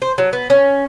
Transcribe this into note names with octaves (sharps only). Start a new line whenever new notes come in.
C5
F#3
B3
C#4